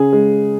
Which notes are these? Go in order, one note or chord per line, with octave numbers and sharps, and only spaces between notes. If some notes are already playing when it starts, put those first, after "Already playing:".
Already playing: C#3 G#4
G#3